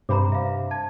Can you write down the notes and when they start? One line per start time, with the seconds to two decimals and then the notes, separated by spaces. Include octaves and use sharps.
0.09 G2 C3 C5 A#5 B5 D6
0.32 E5 F5
0.71 A5 G#6